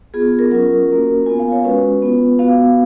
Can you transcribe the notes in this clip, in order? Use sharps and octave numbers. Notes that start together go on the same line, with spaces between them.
B3 F4 G#4
A#4
F#3 C#4 F4 A#4
A#3 C#4 F#4
B3 F4 G#5
F5
C#5
G#3 C#4 F#4 B4
B3 F4
B3 F#4 F5